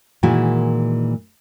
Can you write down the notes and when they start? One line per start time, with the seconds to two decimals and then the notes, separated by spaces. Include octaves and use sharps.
0.23 A#2 D#3 E3 G#3 E4 F#4